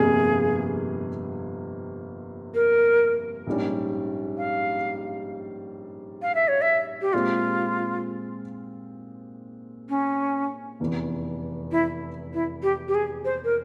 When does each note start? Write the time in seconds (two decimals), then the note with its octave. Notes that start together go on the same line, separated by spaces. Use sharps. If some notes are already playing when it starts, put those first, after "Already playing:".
Already playing: G1 F2 C3 G3 A#3 G#4
2.54 A#4
3.47 A#1 G#2 G3 C#4
4.38 F5
6.22 F5
6.35 E5
6.48 C#5
6.61 E5
7.01 G4
7.13 A#2 G#3 C4 F4 G4
9.89 C#4
10.80 F1 E2 E3
11.71 E4
12.34 E4
12.63 G4
12.88 G4
12.95 G#4
13.25 C5
13.44 A#4